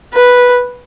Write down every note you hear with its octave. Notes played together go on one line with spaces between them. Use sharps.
B4